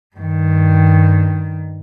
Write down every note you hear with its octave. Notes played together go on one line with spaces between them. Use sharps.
G2 D#3